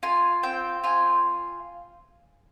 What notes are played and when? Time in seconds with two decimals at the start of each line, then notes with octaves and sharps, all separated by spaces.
0.03 F4 G#5
0.43 C4 G5
0.84 F4 G#5